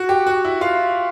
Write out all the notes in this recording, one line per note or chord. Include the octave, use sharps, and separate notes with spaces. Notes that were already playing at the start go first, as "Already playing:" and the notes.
Already playing: F#4
G4
F#4
E4
F4